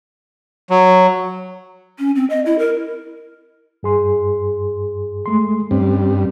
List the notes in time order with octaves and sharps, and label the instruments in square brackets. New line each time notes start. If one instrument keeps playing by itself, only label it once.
[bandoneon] F#3
[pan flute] C#4
C4
D#5
E4
A#4
[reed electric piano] G2 G#4 C6
G#3 A3 C6
[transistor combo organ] G2 [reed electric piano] C4 C#4